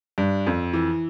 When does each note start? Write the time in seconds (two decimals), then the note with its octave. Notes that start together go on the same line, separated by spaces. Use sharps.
0.18 G2
0.47 F2
0.74 E3